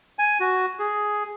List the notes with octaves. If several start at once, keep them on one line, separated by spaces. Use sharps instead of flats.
G#5
F#4
G#4